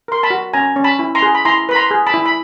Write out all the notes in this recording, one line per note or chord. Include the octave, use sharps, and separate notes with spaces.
A#4 C6
A5 B5
F#4
C#4 G#5 A#5
C#4
A5 B5
E4
A#5 C6
G#4
B5
E4 A#5 C6
B4 B5
A#5 C6
G#4
A5 B5
E4
B5